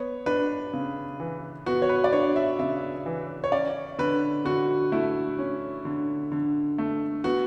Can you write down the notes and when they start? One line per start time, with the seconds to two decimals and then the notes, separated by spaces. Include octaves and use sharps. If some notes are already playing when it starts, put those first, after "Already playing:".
Already playing: B3 C#5
0.26 D4 B4
0.73 C#3
1.20 E3
1.66 B3 F#4
1.82 C#5
1.89 B4
2.04 D5
2.13 D4 C#5
2.36 E5
2.59 C#3 E5
3.06 E3
3.44 C#5
3.52 C#4 D5
3.98 D3 B4
4.45 D3 F#4
4.92 A3 E4
5.39 C#4
5.85 D3
6.32 D3
6.78 A3
7.24 B3 F#4